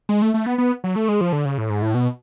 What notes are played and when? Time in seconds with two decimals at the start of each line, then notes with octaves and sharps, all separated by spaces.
0.09 G#3
0.22 A3
0.34 A3
0.46 B3
0.58 B3
0.84 F#3
0.96 A3
1.09 G#3
1.21 F3
1.33 D3
1.45 C#3
1.58 A2
1.70 G#2
1.82 A2
1.94 B2